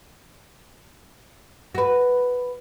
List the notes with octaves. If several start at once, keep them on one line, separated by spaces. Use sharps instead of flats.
F#4 B4